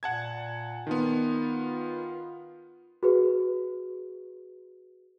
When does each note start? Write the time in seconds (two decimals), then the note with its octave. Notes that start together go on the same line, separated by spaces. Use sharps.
0.03 A#2 F#5 A5 G#6
0.87 D#3 B3 F4
3.03 F#4 G#4 B4